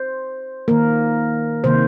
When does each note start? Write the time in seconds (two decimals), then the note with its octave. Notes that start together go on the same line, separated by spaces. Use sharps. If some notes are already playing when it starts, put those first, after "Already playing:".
Already playing: C5
0.68 D#3 A#3 A#4
1.64 C3 D#3 A#3 C5